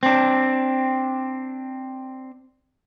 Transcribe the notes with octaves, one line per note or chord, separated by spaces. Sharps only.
C4 D4